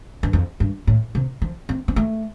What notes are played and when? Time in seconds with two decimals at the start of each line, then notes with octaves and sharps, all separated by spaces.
0.23 G2
0.33 F2
0.60 G2
0.87 A2
1.15 C3
1.42 F3
1.69 C4
1.88 C4
1.96 A3